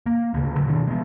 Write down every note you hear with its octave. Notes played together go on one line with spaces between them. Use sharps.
A#3
D2 C#3
D3 F#3
B2 D#3 D4
G#3 B3